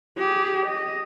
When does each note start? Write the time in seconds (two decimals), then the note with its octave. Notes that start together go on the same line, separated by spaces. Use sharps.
0.17 G4 G#4
0.66 D#5